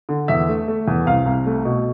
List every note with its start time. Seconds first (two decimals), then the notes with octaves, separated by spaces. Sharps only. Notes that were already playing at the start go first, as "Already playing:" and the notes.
0.09 D3
0.28 E2 E5
0.49 A3
0.68 A3
0.88 E2
1.06 C2 F5
1.26 C2
1.46 A3
1.65 B2